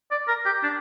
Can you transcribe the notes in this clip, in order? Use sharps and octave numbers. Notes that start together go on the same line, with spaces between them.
D5
A#4
G4
D4